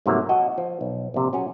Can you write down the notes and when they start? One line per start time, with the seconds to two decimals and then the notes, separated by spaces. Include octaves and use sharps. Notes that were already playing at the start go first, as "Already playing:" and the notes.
0.06 G#2 C3 F3 F#3 A3 A#3
0.29 F#4 D#5 A5
0.58 F3
0.81 B1
1.14 A#1 C3
1.33 F#3 C#4 G#4